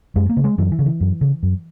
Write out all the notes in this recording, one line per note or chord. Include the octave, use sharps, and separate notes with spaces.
F#2 G#3
A#3
C#3
G#3
F#2 E3
E3
C#3
E3
F#2
C#3
F#2